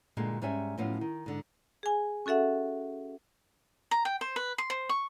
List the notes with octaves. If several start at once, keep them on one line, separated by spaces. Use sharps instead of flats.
G2 A#2 D3 G#3
G#2 G3 C#4 E5 G#5
A2 F3 F#3 B3 C#4 F4
D#3
G#2 D3
G#4 G#5
C#4 F#4 A4 E5 F#5
A#5
G5
C5
B4
C6
C5
C#6